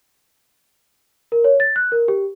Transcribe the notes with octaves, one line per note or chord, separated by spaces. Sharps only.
A#4
C#5
A6
F#6
A#4
G4